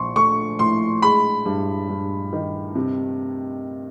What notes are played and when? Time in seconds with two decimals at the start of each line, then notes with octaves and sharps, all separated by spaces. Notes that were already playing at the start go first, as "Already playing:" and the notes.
Already playing: A#1 C6 C#6
0.16 A3 C#6
0.59 A2 C6
1.02 G#3 B5
1.45 G2
1.89 G2
2.33 D#3
2.75 C3